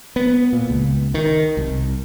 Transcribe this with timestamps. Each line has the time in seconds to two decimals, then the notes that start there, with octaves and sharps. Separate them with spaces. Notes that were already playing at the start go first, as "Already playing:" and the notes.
0.16 B3
0.53 A#2
0.70 C#2
1.14 D#3
1.57 C2